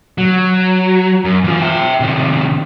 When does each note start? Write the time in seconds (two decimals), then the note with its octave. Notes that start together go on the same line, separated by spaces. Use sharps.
0.18 F#3
1.25 F#2
1.44 E3 F4
1.62 E5 G5
2.00 C3 D#3